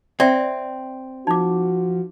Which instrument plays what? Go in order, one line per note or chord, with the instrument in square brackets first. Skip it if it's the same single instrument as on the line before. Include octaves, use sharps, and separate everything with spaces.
[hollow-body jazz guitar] C4 [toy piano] D5 E5 G5
[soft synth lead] F3 [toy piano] D#4 D6 [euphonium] F#4